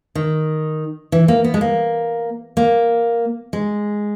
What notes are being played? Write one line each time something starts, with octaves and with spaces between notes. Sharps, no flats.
D#3
E3
A#3
B3
G#3
A#3
A#3
G#3